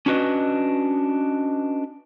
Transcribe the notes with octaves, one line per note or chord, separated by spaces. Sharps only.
C#4 D4 F#4 B4 C5 D#5